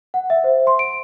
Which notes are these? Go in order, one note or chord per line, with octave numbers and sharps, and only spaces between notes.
F#5
E5
C5
C6
D7